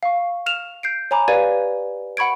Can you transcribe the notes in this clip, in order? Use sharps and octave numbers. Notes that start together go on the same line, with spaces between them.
F5 C#6
F6 E7 F7
G6 C7 D7
C#5 G#5 A#5 B5 D6
G4 B4 D5 F5 G#6 D#7
F#5 B5 C#6 G#6 D7